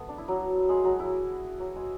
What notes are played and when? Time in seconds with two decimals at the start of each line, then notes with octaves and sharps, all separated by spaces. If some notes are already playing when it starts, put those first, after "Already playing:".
Already playing: A3 B3
0.09 D4
0.18 E4
0.28 F#3 F#4
0.69 G#3 G#4
0.84 F#3 F#4
0.99 E4
1.60 F#3 F#4
1.75 G#3 G#4